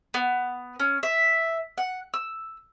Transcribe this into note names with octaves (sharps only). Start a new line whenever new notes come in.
B3
C#4
E5
F#5
E6